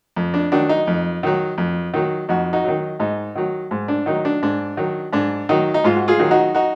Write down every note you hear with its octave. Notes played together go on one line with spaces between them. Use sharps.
F2
D4
D#3 F#3 D4
D#4
F2
D#3 F#3
F2
D#3 F#3
F2 D#4 F#4
D#4 F#4
D#3 F#3
G#2 D#4
D#3 F#3
G#2
D4
D#3 F#3 D#4
D4
G#2 D4
D#3 F#3
G#2 D4
D#3 F#3 D#4
D#4
G#2 F4
F#4
F4 G#4
D#3 F#3
D#4 F#4
D#4 F#4